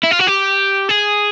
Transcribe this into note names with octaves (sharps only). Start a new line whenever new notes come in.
E4
F4
F#4
G4
G#4